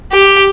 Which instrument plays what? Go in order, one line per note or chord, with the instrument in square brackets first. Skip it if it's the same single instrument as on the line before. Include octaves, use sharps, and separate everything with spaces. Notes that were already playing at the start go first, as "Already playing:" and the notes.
[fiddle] G4